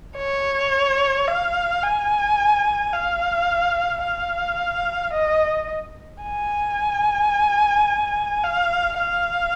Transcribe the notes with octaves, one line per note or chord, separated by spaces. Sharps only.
C#5
F5
G#5
F5
F5
D#5
G#5
F5
F5